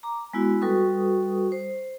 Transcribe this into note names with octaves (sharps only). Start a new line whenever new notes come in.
A#5 D6
G#3 B3 E4 F#4
G3 F#4 A4 B4 C#6 D#6
C5